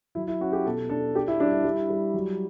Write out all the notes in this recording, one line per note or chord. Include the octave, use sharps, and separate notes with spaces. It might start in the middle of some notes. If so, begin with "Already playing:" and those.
F#3 E4
E4
C#4 F#4
G4
B2 A4
D4 A4
D4 G4
E4
G3 D4
E4
G3
G3
F#3